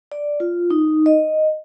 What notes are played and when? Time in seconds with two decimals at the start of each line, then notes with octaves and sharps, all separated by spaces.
0.12 D5
0.40 F4
0.70 D#4
1.06 D#5